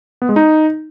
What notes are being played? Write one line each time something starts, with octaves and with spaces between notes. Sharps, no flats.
B3
G#3
D#4